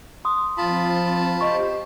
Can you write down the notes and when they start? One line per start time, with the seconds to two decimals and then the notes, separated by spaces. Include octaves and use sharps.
0.25 C6 D#6
0.57 F3 C4 F4 A5 B5
1.41 G4 C5 D#5 C#6